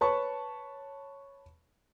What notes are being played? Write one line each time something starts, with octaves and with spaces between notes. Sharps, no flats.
B4 C#5 A5 B5 C#6